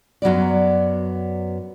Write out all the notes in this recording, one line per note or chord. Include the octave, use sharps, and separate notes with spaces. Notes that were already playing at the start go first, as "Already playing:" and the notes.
F#2 F#3 B3 D5